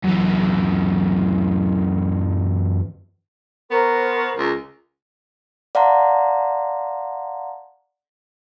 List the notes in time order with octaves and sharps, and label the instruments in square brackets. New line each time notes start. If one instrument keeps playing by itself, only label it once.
[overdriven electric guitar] F#2 E3
[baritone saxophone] B3 [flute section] A#4 C5 C#6
[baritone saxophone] C#2
[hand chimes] D5 F5 F#5 A5 A#5 C6